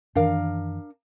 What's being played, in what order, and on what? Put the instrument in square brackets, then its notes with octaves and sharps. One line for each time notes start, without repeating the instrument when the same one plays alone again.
[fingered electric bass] F#2 D#3 E3 [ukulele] D4 A#4 F5